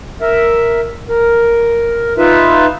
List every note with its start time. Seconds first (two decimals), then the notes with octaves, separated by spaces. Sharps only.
0.22 A#4 E5
1.09 A#4
2.18 D#4 F4 B4 E5